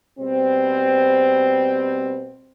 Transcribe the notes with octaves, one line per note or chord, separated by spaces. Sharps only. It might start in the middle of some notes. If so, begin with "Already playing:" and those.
B2 G3 C4